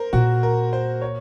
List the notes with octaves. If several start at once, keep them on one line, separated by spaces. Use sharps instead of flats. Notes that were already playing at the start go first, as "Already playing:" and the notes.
Already playing: A#4 C5
A#2 F#4
A#4
C5
C#5